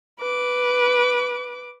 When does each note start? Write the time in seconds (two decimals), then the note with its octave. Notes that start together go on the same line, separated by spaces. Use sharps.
0.19 B4 D6